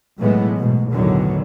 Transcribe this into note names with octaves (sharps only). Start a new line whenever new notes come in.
B1 A2 E3 G#3 A3 B3
G#2 B2
B1 E2 A2 D3 D#3 F#3